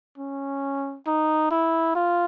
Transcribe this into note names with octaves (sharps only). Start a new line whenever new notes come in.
C#4
D#4
E4
F4